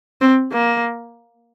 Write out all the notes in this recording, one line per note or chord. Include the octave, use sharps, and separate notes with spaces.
C4
A#3